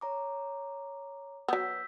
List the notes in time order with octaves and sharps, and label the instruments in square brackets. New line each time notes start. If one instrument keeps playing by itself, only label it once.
[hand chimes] C#5 A#5 D6
[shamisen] F#3 B3 [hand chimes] E6 G6 B6